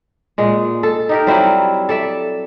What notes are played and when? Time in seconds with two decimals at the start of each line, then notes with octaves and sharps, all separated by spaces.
0.38 A#2 G#3
0.83 A4
1.09 D#4 G4 A#4
1.27 F#3 G3 C4 E4
1.89 A4 D5 E5